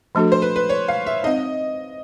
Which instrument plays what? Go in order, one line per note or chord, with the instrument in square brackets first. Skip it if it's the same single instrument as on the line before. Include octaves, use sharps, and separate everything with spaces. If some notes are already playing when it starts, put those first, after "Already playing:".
[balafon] F3 A3 D4 F#4 A4
[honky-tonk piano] C5
B4
B4
C#5
F5
E5
[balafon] C4 D#4 [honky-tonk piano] D#5